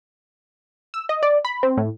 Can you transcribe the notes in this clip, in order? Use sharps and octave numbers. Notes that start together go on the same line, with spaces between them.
E6
D#5
D5
B5
C4
A2